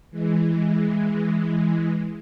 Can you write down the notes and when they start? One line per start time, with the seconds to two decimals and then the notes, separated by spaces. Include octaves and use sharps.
0.11 E3 G#3